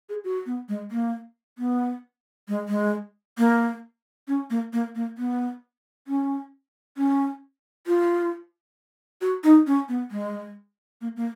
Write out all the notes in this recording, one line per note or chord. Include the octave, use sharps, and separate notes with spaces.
G#4
F#4
B3
G#3
A#3
B3
G#3
G#3
A#3
C#4
A#3
A#3
A#3
B3
C#4
C#4
F4
F#4
D#4
C#4
B3
G#3
A#3
A#3